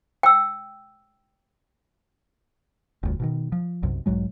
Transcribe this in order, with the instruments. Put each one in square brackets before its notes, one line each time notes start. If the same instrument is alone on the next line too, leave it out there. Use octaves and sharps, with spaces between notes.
[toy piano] G5 E6
[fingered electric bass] F1 D2 G2
B2 D3 D#3
F3
B1 F#2 C3
B1 G#2 F#3 G#3